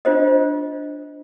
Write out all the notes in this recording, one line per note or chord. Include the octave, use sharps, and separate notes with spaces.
D4 F4 C5 D#5